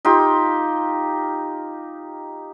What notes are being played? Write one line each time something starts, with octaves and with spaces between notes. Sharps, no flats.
D#4 F4 G4